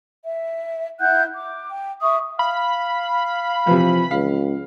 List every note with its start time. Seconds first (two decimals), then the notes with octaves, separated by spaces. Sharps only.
0.25 E5
1.00 E4 F#5 F#6 G6
1.33 D6
1.71 G5
2.01 E5 C#6 D#6
2.39 F5 B5
3.67 C3 E3 F3
4.11 C#2 F5